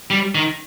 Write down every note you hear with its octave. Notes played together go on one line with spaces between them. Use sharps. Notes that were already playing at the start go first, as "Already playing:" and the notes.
G3
D#3